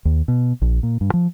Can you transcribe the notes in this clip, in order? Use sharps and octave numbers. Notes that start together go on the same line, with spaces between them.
D#2
B2
A#1
A#2
G2
F3